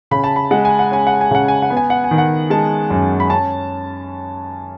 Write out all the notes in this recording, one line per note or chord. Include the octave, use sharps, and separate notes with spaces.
C#3 B5
A5
B5
G#3 F#5
G#5
F#5
C#4 G#5
F#5
G#5
C#3 F#5
G#5
F#5
B3
G#5
F#5
G#5
D#3
F#5
G#3 A5
F#2
B5
C#4 A5